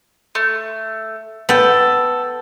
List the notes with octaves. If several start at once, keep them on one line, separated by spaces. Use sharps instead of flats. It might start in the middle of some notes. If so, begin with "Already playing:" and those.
A3
B3 A4 G5